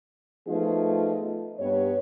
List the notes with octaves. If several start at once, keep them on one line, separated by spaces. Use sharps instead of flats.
F3 A3 B3 D#4 F4 G#4
G2 B3 G4 C#5